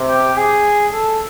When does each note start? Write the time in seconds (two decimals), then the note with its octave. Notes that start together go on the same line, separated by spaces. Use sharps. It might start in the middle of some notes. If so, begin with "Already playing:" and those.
Already playing: C3
0.08 G4
0.37 G#4
0.93 A4